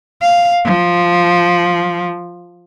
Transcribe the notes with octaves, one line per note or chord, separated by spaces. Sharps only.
F5
F3